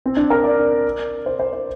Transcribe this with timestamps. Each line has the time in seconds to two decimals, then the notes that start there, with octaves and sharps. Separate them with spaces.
0.06 C4
0.17 D4
0.30 A#4
0.44 D5
1.26 C5
1.40 C5
1.53 C5